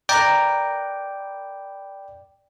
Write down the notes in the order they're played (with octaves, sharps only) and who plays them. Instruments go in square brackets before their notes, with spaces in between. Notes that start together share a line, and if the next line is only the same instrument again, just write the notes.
[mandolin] A#4 B4 [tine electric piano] D5 G5